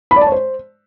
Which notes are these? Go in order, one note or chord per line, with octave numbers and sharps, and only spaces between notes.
B5
D5
A5
C#5
C5